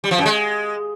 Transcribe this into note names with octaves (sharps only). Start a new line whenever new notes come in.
G3
F3
F#2
G#3